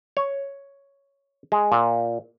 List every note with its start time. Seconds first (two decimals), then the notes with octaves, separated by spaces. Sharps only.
0.17 C#5
1.52 G#3
1.72 A#2